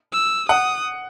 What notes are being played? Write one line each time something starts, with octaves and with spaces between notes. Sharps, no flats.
E6
F#5 D#6